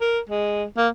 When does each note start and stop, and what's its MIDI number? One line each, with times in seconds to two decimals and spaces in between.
0.01 0.20 70
0.29 0.64 56
0.77 0.88 58